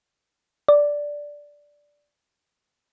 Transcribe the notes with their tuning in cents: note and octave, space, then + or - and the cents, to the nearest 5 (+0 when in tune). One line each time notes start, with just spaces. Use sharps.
D5 -5